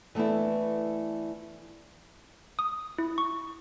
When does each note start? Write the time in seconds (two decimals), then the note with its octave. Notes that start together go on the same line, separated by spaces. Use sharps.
0.15 E3 A3 B3 D4 E4
2.59 D#6
2.98 E4
3.18 C#6